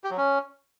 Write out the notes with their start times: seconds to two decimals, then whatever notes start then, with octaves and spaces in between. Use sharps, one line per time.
0.04 G4
0.11 F#3
0.18 C#4